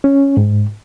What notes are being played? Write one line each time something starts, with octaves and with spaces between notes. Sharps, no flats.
C#4
G#2